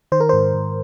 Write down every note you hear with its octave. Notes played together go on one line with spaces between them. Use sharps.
D#3 C5
A#4
G#2 C5
G#2